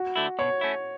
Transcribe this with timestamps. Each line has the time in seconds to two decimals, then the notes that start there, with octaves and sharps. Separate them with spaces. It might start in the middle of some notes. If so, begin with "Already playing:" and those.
Already playing: F#4
0.16 D3 A3 E4
0.39 B2 C#5
0.61 A3 C#4 E4